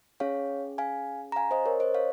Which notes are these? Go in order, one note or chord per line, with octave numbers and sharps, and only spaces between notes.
C#4 G#4 C#5 F5
F5 G#5
A#5
F5 G#5
C5 D#5
A#4 C#5
C5 D#5
C#5 F5